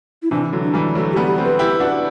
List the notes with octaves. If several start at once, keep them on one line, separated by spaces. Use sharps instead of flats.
E4
C3 E3 D4
D3 F#3
D4
E3 G3
F#3 A3 F#4
G4
G3 B3
G4
A3 C4
B4
E4 G4
D4 F#4